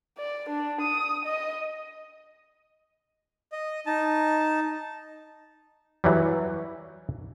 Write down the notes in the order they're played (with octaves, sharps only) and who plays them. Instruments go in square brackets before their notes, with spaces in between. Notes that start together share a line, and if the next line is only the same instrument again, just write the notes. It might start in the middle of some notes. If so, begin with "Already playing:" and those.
[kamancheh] D5
D4
D#6
D#5
[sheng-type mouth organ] D#5
D#4 A5
[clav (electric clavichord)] E3 F#3 G3